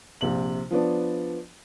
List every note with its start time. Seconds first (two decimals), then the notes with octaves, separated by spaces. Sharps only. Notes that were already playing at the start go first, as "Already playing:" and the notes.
0.21 A#1 C3 F#7
0.71 F3 B3 D4